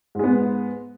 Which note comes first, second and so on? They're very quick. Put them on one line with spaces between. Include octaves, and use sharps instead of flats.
G#2 G#3 B3